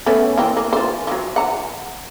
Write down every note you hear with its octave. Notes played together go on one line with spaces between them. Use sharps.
A3 B3 C#4
E3 A#3 C4
A#3
F4 C5
F3 F#3
F#5 A#5